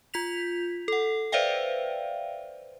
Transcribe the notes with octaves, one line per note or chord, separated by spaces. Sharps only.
F4 G6 B6 F7
A4 F#5
B4 C5 D5 E5 F5 G5